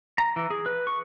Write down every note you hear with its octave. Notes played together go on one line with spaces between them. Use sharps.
A#5
E3
G#4
B4
C#6